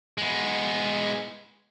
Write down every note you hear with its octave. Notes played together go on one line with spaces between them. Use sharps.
G#3 B3